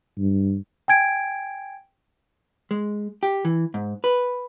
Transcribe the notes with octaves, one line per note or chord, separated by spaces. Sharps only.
G2
G5 G#5 G#6 D7
G#3
G4
E3
G#2
B4